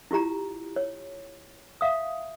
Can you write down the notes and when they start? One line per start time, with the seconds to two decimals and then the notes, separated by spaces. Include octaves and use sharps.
0.11 E4 F4 G4 A#5
0.76 C#5
1.81 E5 F5 D#6